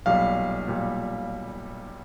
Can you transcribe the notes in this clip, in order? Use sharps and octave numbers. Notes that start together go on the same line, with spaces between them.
B1 A#2 G3 F5
B1 A#2 G3